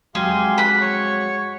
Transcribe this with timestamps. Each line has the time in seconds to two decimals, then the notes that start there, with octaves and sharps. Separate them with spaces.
0.15 F2 F#3 G#3 G4 G#4 F5 C6
0.58 F#5 B5
0.81 C#5 C#6